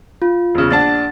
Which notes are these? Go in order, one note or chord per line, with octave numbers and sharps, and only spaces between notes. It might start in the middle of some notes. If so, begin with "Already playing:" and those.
F4
E1 C#3
A#1 D4 F#5 A5 A6